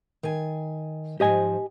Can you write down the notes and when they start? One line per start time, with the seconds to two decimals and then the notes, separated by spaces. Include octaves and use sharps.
0.23 D#3 G#5
1.20 G#2 F3 G4 D#5 G#5